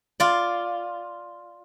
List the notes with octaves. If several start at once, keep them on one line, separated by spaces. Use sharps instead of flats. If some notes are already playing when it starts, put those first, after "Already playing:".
F4 D5